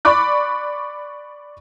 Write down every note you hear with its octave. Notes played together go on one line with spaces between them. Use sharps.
D5 B5 C#6 D6 F#6